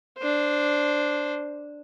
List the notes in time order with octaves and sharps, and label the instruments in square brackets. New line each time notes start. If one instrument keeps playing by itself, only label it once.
[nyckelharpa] D4 C5